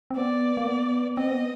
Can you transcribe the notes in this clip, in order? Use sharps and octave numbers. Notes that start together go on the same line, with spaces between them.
C4
B3 D5
A#3
B3
C4 D#5
B3